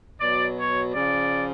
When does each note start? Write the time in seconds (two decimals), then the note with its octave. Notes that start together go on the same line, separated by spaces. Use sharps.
0.20 B2 F#3 D5
0.57 C#5
0.93 C#3 F3 D5